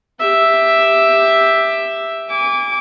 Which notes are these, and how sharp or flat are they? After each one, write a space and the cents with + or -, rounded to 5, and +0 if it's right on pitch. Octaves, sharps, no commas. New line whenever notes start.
G4 +10 E5 +0
G#5 -35 D6 -20